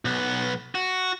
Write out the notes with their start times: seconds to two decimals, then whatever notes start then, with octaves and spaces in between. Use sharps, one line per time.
0.05 B1 B3
0.75 F#4